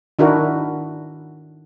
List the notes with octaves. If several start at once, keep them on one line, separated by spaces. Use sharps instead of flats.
D#3 D4 E4 F#4 A#4